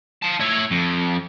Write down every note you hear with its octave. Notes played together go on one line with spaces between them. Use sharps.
F5 A5
E4 C#5
F2